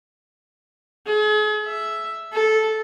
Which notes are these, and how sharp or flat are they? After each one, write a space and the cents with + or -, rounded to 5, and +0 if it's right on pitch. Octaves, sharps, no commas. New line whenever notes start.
G#4 +40
E5 +5
A4 -10